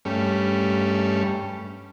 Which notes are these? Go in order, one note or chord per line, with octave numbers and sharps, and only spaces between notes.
G2 G3 A3 C#4